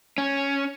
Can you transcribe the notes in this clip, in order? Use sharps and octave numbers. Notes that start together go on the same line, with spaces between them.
C#4